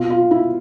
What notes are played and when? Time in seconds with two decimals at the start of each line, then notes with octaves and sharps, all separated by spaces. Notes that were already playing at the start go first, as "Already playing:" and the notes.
Already playing: B2 F4
0.10 F4
0.31 E4